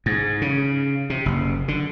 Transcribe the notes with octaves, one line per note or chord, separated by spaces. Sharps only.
G#2
C#3
C3
F#1
D3